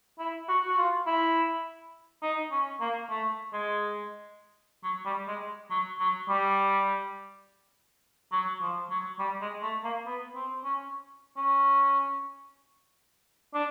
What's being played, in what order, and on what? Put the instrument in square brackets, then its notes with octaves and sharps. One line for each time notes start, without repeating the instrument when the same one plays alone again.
[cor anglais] E4
F#4
F#4
F4
E4
D#4
C#4
A#3
A3
G#3
F#3
G3
G#3
F#3
F#3
G3
F#3
F3
F#3
G3
G#3
A3
A#3
B3
C4
C#4
C#4
D4